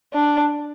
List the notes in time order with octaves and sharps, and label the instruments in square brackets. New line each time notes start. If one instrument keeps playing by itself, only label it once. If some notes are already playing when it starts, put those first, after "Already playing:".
[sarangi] D4